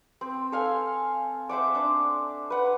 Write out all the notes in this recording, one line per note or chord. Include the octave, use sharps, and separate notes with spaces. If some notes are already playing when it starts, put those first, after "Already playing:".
C4
A4 F5 G#5
C5 E5 F#5 D6
D4
B4 F#5